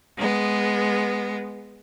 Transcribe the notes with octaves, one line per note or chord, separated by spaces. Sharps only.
G#3 B3